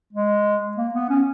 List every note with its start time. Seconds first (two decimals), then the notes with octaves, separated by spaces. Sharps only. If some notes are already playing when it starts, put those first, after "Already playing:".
0.13 G#3
0.77 A#3
0.94 B3
1.09 C#4